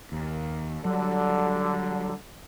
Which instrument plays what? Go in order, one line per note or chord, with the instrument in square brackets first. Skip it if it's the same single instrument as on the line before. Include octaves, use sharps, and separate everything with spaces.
[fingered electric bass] D#2
[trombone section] D3 [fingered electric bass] F#3 G3